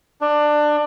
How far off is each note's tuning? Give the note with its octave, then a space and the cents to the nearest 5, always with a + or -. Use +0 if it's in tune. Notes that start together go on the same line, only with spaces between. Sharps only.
D4 +20